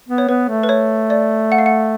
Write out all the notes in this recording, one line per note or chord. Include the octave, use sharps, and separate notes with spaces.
B3
C#5
B3 B4
A3
B4
C#5
D5
F#5
F5
F#5